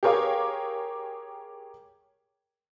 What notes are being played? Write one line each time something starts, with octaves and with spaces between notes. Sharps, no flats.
G4 G#4 A#4 C#5 F5 D6